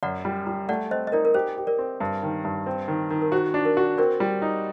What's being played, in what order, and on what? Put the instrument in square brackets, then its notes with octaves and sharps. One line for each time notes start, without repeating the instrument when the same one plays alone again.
[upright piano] F#2 [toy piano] D5 F#5
[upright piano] G3
G3
[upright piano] A3 [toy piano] D5 F#5
[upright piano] C4 [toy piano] C5 D#5
[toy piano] D#5
[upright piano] D#4 [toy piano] A#4 D5
[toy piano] A#4
[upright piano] G4 [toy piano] C5
[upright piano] G4
[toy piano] A#4 D5
[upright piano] C4
G2
D#3
G2
C4
D#3
D#3
[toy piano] A#4
[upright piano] F#4 [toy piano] C5
[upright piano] D4
[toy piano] A#4
[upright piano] F#4
[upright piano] C4 [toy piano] A#4 D5
[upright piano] G3
D#4